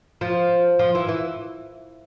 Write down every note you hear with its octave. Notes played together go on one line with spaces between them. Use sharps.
F3
F3
E3
E3